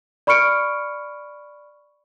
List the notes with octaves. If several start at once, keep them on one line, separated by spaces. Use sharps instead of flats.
D5 B5 C#6 F6 C#7 D7